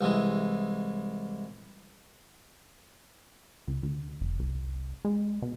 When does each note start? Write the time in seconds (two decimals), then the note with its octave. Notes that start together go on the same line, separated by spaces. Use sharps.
0.01 C2 E3 G#3
3.68 C#2
3.83 D2
4.21 F1
4.39 C2
5.05 G#3
5.42 B2